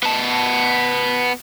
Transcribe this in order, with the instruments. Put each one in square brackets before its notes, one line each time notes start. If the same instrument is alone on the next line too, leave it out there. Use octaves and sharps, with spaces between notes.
[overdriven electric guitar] B3 A5